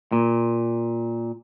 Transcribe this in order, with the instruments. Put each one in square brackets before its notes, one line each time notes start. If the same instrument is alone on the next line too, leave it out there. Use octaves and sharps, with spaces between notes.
[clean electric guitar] A#2